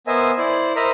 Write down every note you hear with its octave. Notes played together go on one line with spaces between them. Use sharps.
B3 A#4 C5 D#5 E5 G#5
E4 C5 D5
A#4 C5 D#5 E5 A#5 B5